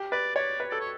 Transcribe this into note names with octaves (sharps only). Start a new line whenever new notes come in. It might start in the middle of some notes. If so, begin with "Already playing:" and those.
Already playing: G4
B4 D5
C#5 D5
B4
A4 D5
C#5